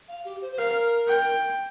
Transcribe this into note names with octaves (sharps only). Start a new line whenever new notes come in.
F5
G4
C5
C5
A#4 F5
G5